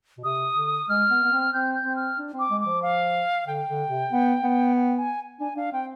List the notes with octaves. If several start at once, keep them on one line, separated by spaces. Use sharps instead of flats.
B2
C3 D#6
D3
G#3 F6
B3
B3
C4
C4 G6
G6
C4
F6
D4
C4
D6
G#3
F3 D6
F5
D3 G5
D3
C3
B3
B3
G5
G#5
D4 G#5
D4 F5
C4 G5